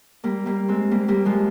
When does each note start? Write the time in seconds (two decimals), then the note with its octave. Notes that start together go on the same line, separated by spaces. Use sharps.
0.24 G3 A#3
0.46 G3 A#3
0.68 G#3 C4
0.91 G3 A#3
1.08 G3 A#3
1.25 F3 G#3